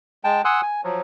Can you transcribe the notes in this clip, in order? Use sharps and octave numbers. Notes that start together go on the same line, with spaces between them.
G#3 G5 A5
F#5 G#5 C6 D#6 E6 F#6
G#5
F3 F#3